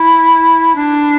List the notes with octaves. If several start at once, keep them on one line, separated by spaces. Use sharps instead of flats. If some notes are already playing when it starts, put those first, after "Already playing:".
Already playing: E4
D4